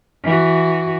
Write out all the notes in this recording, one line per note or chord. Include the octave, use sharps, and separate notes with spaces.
E3 F#4